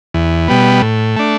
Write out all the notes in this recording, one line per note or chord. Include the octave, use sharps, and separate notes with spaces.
E2
B2 G3 B3
A2
A3 D4